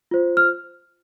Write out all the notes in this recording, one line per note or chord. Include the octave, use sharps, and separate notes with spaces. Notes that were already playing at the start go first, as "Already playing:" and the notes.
F4 C5
F6